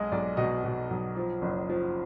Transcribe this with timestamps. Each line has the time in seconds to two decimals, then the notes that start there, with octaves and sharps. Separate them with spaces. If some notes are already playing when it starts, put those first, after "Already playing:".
Already playing: B1 G#3 D#5
0.12 B1 D5
0.37 B2 D#5
0.64 B2
0.91 B1
1.16 F3
1.42 F#1
1.69 F3